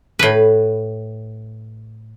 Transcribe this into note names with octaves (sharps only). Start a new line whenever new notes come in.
A2 B4